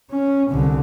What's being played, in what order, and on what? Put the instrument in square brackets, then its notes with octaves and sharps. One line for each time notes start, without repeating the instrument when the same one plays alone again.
[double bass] C#4
C2 D3